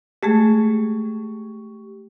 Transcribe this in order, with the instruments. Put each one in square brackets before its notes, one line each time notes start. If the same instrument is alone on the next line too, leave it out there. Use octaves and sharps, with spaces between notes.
[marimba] G#3 A3 G#4 [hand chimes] G4